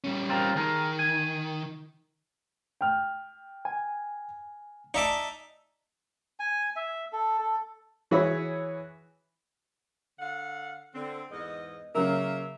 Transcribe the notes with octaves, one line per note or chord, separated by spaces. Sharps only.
G3 C#4
C4 F4 A#4
D#3 G#4 A#4
G#5
G5 F6
G#5
D#4 D5 E5 G#5 A5 D6
G#5
E5
A4
A4
E3 F#4 G#4 B4 C#5 E5
D3 F5 F#5
D3 C4
E2 G#2 D#5
C#3 F#3 A#3 A#4 C#5 E5